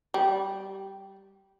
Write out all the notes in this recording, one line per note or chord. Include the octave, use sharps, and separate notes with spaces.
G3